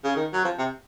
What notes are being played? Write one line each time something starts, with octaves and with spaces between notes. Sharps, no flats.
C#3
D#3
F#3
F3
C3